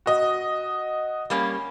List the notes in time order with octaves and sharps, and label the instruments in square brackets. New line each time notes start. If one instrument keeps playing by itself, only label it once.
[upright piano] F#4 D#5
[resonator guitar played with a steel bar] G3 A#3 C#4